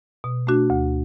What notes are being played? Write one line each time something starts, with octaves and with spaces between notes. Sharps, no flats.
B2
A3 D4 F#4
D2